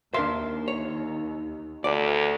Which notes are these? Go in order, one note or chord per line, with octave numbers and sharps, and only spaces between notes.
D#2 D4 A#4 E5 F5 C6
C#5
D2 D5